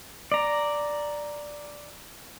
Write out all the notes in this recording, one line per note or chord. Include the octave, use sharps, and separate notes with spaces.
D5 A#5